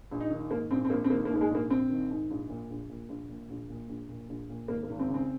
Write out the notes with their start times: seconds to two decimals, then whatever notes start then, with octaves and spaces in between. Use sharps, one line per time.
0.11 A#1
0.20 D#4
0.30 D#3
0.51 G#2 A#3
0.71 A#1 C4
0.85 C4
0.90 A#1 A#3
1.04 C4
1.10 D#3 A#3
1.25 A#3
1.31 G#2
1.36 A#3
1.41 G#3
1.50 A#1 A#3
1.70 A#1 C4
1.90 D#3
2.11 G#2
2.31 A#1
2.50 A#2
2.70 A#1
2.89 A#2
3.09 A#1
3.29 A#2
3.50 A#1
3.70 A#2
3.89 A#1
4.09 A#2
4.29 A#1
4.50 A#2
4.68 G#1 A#3
4.83 A#3
4.89 G#1
4.99 C4
5.09 C#3
5.14 C4